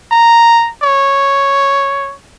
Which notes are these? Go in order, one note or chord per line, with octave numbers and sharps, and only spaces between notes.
A#5
C#5